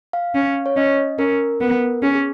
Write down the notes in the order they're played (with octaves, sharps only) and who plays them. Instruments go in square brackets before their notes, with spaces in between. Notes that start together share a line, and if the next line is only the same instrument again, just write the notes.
[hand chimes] F5
[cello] C#4
[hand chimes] C#5
[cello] C#4 [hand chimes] D#5
[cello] C#4 [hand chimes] A#4
[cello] B3 [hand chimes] A#4
[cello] C#4 [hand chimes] G#4
[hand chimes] G#4